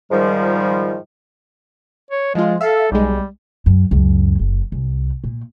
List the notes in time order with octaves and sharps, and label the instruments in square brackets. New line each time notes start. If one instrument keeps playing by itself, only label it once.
[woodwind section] G#2 D#3 F3 G3
[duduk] C#5
[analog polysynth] F3 F4 [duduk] G#3
[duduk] A4 [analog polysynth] E5 F5
[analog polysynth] B1 G#3 [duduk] G3
[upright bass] F#2
C#2 F#2
F#1
C2
A#2